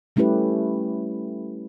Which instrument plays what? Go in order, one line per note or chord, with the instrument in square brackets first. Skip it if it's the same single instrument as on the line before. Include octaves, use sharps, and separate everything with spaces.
[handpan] G3 A3 C#4 E4 G4 B4